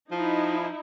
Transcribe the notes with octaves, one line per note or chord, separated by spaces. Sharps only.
F3 D#4 E4